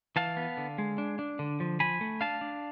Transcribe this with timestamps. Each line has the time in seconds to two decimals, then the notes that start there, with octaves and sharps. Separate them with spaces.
0.16 E3 F5 A5
0.37 B3
0.57 D3
0.78 G#3
0.98 D4
1.19 D4
1.39 D3
1.60 F3
1.80 F3 G#5 B5
2.01 A3
2.21 D4 F5 A5
2.41 D4